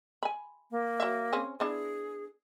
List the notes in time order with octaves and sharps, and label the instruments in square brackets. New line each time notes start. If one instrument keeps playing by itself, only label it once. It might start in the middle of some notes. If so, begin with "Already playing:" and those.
[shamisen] G#5 B5
[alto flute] A#3
[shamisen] F#3 E5
C4 C#4 G#4
[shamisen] B3 D4 E4 [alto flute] G#4